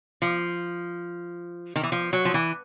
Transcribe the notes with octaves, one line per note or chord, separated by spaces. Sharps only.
F3
D#3
E3
F3
F#3
F3
E3